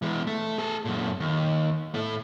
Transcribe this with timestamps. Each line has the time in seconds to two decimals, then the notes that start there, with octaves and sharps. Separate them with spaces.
0.02 E3 G#3
0.27 A3
0.58 G#4 A4
0.85 F#2 A#2
1.20 D#2
1.94 A2 A3